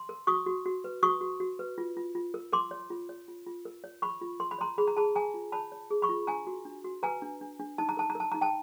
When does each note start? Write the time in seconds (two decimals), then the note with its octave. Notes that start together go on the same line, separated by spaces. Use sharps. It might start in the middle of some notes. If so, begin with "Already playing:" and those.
Already playing: C6
0.09 A#4
0.27 F#4 C#6 D#6
0.46 F#4
0.65 F#4
0.84 B4
1.03 F#4 C#6 D#6
1.21 F#4
1.40 F#4
1.59 B4
1.78 F4
1.97 F4
2.15 F4
2.34 A#4
2.52 A#4 C6 D6
2.71 C#5
2.90 F4
3.09 C#5
3.28 F4
3.47 F4
3.65 A#4
3.84 C#5
4.02 A#4 B5 C#6
4.21 F4
4.40 A#4 C6
4.51 B5
4.58 C#5 A#5 C6
4.78 G#4 B5
4.87 A#5
4.97 G#4 A5 B5
5.15 G#4 G#5 A#5
5.34 F4
5.52 C#5 A5 B5
5.72 C#5
5.90 G#4
6.02 B5 C#6
6.09 F4
6.27 D4 G#5 A#5
6.47 F#4
6.65 D4
6.84 F#4
7.03 B4 G#5 A#5
7.22 D4
7.41 D4
7.60 D4
7.78 D#4 A5
7.89 A#5
7.97 A#4 A5
8.10 A#5
8.15 A#4
8.20 A5
8.32 D#4 A#5
8.41 G5 A5